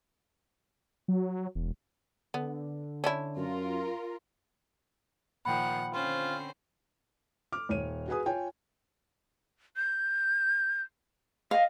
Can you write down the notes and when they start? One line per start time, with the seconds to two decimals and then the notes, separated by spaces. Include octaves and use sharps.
1.08 F#3
1.55 E1
2.34 D3 B3
3.04 C#4 D4 E4
3.37 F#2 F4 A#4
5.45 A#2 D#3 F3 F#5 G5 B5
5.94 D3 C4 C#4 F4 C5
7.52 D6 F6
7.69 D#1 C#5 D#7
8.08 F#4 G#4 B4 G#5 D#6
8.26 F4 C#5 G5 G#5
9.76 G6
11.51 D#5 F5